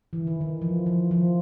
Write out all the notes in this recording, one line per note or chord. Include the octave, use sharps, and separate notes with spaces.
E3
D#3
E3
F3
F3
F3